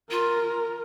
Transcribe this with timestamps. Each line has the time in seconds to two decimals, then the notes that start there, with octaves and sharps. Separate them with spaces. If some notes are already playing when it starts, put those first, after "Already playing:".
0.11 F4 A#4